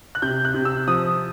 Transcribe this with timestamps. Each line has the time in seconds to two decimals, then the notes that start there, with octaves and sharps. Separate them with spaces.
0.15 F#6
0.22 C3 G6
0.45 F#6
0.54 C3
0.65 E6
0.87 F3 D#6